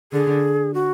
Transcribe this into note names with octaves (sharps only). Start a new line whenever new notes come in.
D3 G#4
F#4